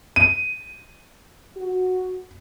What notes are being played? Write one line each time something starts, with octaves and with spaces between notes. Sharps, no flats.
D#7
F#4